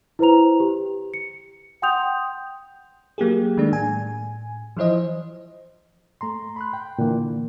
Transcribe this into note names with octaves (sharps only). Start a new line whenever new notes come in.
E4 B4 C5 A#5 F7
G4
C#7
F#5 G5 C6 D#6 G6 F7
F#3 A#3 G4 G#4
D#3 G#3 A3 D4
A2 G#5
E3 F3 E4 C5 D#5
A3 A#5 C6
B5 C6 F#6
G5
A#2 D3 E3 A#3